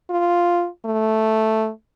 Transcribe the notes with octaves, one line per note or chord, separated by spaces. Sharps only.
F4
A3